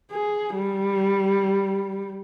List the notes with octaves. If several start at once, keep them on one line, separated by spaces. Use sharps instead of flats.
G#4
G3